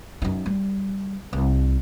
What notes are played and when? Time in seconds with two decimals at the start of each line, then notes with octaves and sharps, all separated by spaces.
0.22 F#2 D#4
0.46 G3
1.33 C2